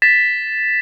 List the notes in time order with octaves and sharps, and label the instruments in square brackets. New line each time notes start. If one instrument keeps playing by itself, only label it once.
[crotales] A6 B6 E7